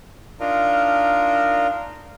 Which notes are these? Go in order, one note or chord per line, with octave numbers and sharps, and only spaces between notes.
D4 D#4 F4 A#4